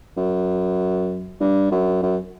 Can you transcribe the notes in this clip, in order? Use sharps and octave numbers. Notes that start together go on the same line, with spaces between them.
F#2
G2
F#2
F#2